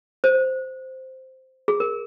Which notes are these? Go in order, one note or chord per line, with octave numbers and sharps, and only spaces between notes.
C5
G#4
A#4